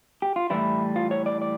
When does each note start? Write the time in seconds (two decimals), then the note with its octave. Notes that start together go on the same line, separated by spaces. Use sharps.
0.22 G4
0.36 F4
0.50 A2 E3 G3 E4
0.96 F4
1.11 C#5
1.26 D5
1.42 D5